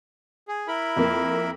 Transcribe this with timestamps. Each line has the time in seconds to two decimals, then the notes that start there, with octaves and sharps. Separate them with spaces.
0.48 G#4
0.68 E4 A#4 B5
0.96 F2 A#3